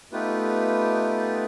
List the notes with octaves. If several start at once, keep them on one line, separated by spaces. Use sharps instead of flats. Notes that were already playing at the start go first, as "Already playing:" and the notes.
A3 B3 D#4 F4 G4 B4